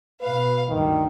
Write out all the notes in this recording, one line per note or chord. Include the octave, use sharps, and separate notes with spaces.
B2 B4 F5
D2 G2 D#3